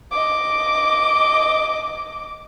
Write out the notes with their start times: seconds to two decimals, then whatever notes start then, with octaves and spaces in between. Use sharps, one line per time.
0.12 D#5 D6